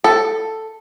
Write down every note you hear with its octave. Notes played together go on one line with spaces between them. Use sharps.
A4